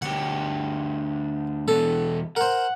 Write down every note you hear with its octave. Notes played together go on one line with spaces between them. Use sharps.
D2 G4 F#5
E2 B2 A4
A#4 C5 F#5